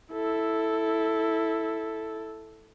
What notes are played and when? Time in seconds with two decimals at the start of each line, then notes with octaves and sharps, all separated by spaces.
0.13 E4 A4